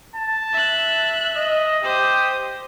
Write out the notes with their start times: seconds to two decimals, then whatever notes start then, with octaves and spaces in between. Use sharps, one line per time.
0.16 A5
0.53 E5 F#6
1.36 D#5
1.83 G4 C5 D#6